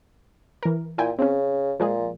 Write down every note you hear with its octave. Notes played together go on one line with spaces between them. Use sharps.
E3 A#4
A#2 E4 G5 G#5
C#3 C4 C#4
A#2 F3 G#3 G#4